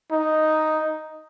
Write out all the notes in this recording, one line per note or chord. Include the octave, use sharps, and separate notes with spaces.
D#4